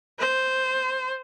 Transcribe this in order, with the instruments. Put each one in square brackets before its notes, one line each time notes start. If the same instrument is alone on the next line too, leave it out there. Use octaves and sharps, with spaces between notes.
[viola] C5